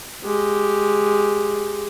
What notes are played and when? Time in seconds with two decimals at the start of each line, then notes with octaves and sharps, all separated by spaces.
0.24 G#3 G4